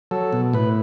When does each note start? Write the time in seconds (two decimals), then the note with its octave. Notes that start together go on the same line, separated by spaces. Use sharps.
0.11 F#3 A4
0.33 B2
0.53 A2 B4